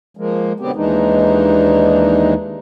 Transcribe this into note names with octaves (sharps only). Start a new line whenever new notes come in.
F3 G#3 A#3
B2 D3 F#3 B3 C4 G4
D#2 E3 G#3 D4 D#4